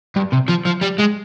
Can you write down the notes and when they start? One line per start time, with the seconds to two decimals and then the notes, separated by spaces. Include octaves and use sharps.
0.16 G2
0.33 C3
0.49 F3
0.67 F3
0.83 G3
0.99 G#3